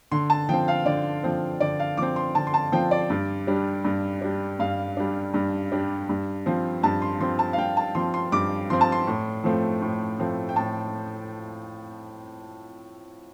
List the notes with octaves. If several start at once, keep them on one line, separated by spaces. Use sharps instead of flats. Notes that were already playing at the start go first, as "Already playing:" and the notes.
D3 C6
A5
F3 C4 G5
F5
D3 D5
F3 C4
D3 D5
F5
F3 C4 D6
C6
D3 A5
C6
A5
F3 C4 G5
D5
G2
G3 D4
G2
G3 D4
G2 F5
G3 D4
G2
G3 D4
G2
F3 C4
G2 A5
C6
F3 C4 C6
A5
F5
G2 G5
A5
F3 C4 C6
C6
G2 D6
F3 C4 C6
A5
C6
A2
F3 A3 C4
A2
F3 A3 C4
G5
A2 A5